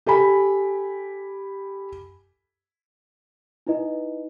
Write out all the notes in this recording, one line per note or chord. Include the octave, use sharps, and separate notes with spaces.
G4 A4 G#5 B5
D#4 E4 B4 D#5